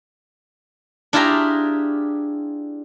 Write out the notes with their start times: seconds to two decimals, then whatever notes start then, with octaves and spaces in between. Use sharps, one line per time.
1.13 D4 E4 F4 G4 G#4 A#5